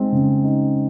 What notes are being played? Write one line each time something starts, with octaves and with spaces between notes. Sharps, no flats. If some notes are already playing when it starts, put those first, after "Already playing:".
Already playing: G#3 C4 D#4
C#3
D#4